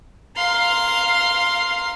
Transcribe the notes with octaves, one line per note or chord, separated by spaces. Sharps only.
F5 A#5 C6